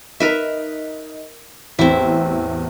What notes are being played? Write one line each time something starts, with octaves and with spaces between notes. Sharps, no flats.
D#4 A#4 B4 E5
A1 E2 C4 E4